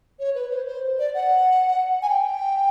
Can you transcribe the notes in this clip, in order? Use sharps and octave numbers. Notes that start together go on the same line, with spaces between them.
C#5
B4
C5
C5
D5
F#5
G#5
G5